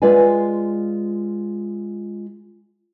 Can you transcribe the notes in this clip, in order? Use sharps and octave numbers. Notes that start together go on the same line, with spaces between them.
G#3 F4 B4 D5 F5 G#5